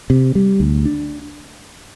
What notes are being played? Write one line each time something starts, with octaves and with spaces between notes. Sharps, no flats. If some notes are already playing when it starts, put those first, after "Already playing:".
C3
G3
D2
D4